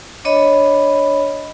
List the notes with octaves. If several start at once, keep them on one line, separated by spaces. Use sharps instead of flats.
D4 C#5 D#5 B5